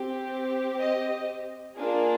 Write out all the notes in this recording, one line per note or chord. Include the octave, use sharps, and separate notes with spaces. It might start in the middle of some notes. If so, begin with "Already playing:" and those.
Already playing: C4 G4
D#5
A#3 D4 F4 G#4